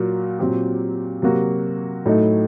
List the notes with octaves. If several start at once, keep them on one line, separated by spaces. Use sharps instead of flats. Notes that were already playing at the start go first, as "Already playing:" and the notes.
Already playing: A#2 F#3 A#3 F#4
A#2 F#3 C4 G4
C3 F#3 A#3 F#4
A2 F#3 A3 D#4